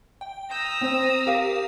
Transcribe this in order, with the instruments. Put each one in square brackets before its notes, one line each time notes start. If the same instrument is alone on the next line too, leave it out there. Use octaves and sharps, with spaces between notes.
[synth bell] G5
[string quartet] A#5 D#6 E6 [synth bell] G6
[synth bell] C4 C5
G4 A#4 F5